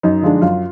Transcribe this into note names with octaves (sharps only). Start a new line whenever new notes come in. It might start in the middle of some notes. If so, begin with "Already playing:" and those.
F#2 D#4 D#5
D3 F3 G#3 D4
F#2 F4 F5